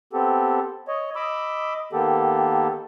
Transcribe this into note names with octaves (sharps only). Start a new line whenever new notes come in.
B3 C4 G4 A4
C#5 D#5
D#5 B5 D6 E6
D#3 A#3 B3 G4 A4